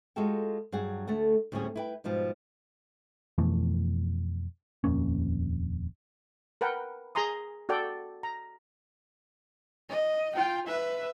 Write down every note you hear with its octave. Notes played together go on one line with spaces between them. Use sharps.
G#3 F4 F#4 A4 G5
G2 F#3 G#4 F#5
D2 A3 A4 F#5
D2 A2 G3 C4 C#4 G#4
E4 B4 G5
G#2 B2 F3 G3
F2 B2 E3 A3
D#1 F2 A#3 C#4
A#4 B4 F#5 G5
G#4 G#5 A#5 C6 D#6
F#4 A4 D5 G5
A#5
D#5
F4 G5
B4 E5